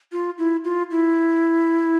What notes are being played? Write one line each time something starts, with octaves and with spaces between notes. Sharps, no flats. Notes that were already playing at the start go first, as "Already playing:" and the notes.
F4
E4
F4
E4